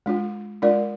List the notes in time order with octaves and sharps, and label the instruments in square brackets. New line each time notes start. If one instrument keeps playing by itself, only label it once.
[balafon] G#3 D4 F4
G#3 D4 F4 A#4 D5